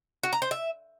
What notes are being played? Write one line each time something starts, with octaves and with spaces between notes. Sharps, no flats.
F#4
A#5
C5
E5